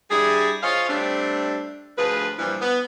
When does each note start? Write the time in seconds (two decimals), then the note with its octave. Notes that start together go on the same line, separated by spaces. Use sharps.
0.11 G3 D4 E4 G#4
0.62 F4 G#4 C5 C#5 D#5 F5
0.89 G3 A3 C4 D4
1.97 D2 F3 G#4 B4
2.38 G2 A#2 E3 F3 G3
2.61 B3